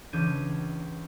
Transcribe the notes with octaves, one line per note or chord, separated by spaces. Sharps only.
C#2 E3 D4 G6 G#6 D#7